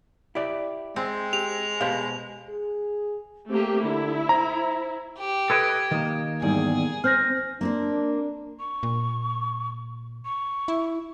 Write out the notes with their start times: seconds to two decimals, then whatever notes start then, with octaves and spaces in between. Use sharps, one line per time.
0.35 E4 G4 D5
0.96 G#3 C4
1.33 G4 F7
1.81 B2 G4 C5 F5
2.49 G#4
3.49 A3 A#3 C4 G4
3.84 D3 E4
4.29 C5 A#5
5.19 G4
5.50 A4 B4 D#5 G#6 D7
5.91 D#3 A#3 D#5
6.42 E2 G#2 G3 G#4
7.04 C4 F6 G6 A#6
7.61 A#3 C4 D4 C5
8.60 C#6
8.83 A#2
10.25 C#6
10.68 E4